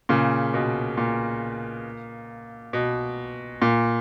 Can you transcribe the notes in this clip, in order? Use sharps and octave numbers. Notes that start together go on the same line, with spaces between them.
A#2 C#3
B2
A#2
B2
A#2